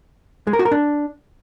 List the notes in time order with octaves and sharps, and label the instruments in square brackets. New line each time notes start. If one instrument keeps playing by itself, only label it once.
[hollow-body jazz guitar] G#3
A#4
F#4
A#4
D4